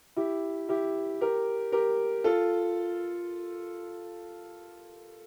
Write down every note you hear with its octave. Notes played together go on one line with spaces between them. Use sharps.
E4 G4
E4 G4
G4 A#4
G4 A#4
F4 A4